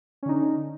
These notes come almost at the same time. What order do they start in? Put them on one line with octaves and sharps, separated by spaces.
C#4 D3 D#4